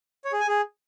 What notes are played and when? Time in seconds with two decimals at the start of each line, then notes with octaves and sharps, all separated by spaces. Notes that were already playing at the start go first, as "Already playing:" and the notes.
0.25 C#5
0.32 G#4
0.40 G#5
0.48 G#4